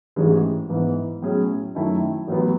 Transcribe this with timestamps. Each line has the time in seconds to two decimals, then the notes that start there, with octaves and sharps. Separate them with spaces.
0.16 A1 G#2 E3 G#3 C#4
0.69 G#2 E3 B3
1.22 B1 A2 F#3 C#4 G#4
1.75 F#2 D#3 A3 E4 A4
2.28 A1 A2 F#3 B3